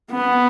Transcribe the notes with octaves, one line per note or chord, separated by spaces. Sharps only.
B3